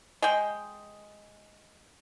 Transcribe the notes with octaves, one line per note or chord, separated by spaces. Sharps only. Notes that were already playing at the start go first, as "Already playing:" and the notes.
G#3 G5